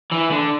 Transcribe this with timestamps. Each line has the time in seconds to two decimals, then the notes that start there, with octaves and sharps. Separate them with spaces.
0.12 E3
0.32 D3